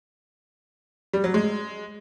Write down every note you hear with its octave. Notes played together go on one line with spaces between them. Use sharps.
G3
F#3
G#3